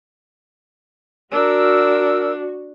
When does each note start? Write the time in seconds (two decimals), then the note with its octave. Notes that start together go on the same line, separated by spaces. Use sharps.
1.33 D4 F#4 A#4 E6